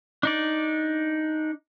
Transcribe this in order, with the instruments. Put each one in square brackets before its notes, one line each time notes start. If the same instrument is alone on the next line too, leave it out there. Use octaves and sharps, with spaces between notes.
[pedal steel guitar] D4 D#4 D5